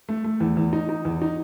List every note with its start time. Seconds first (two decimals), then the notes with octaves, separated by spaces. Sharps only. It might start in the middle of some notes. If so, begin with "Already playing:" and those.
0.09 A3
0.24 A3
0.40 E2
0.57 E2
0.73 D#4
0.89 D#4
1.05 E2
1.22 D#4